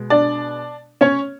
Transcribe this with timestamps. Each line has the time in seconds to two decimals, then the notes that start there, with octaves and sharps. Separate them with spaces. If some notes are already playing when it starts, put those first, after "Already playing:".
Already playing: B2 G#3
0.10 D4 D5
1.01 C#4 C#5